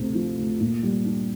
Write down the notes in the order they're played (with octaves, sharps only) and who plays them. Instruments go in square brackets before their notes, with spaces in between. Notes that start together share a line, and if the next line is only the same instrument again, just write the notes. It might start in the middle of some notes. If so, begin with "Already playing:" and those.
Already playing: [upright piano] D2 C3
F3
D2
A#2
G3
D4